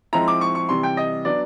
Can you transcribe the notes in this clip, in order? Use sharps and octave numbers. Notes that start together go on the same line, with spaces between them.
F3 G#3 C4 E4 A#5
D6
C#6
C#6
C3 E3 G3 C6
G5
D#5
F#3 B3 D4 D5